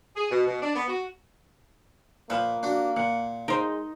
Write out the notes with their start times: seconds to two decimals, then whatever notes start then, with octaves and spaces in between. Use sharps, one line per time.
0.16 G#4
0.30 B2
0.46 B2
0.61 D4
0.75 B3
0.88 F#4
2.30 A#2 F3 A#3 B4
2.63 D4 F#4
2.96 A#2 F#5
3.48 G#3 D#4 A#4 C5